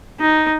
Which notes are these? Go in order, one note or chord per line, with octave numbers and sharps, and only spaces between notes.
D#4